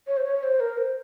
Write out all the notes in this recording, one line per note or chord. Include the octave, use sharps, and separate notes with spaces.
C#5
C5
C#5
C5
A#4
C5